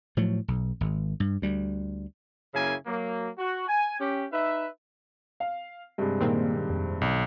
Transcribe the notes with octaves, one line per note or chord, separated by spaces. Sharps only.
A2 F3 F#3
B1
G#1
G2
D2 G3
F#2 C#3 A#3 E4 G#5
F#3 A#3
F#4
G#5
C#4 G4
D#4 B4 E5
F5
G2 C3 G#3
A#2 D#3 A#3 C4
F2
B1